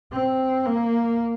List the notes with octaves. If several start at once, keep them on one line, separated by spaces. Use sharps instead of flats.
C4
A#3